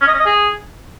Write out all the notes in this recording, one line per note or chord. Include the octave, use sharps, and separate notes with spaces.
C#4
D#5
C#4
D#5
G#4